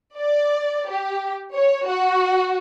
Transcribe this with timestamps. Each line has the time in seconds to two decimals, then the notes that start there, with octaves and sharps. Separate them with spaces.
0.18 D5
0.89 G4
1.54 C#5
1.88 F#4